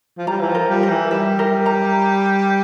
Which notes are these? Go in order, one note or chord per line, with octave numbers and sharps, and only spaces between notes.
F3
G3 A#5
E3
F3
A#4
G3
A#4
E3
G3 E5
A#4
A#5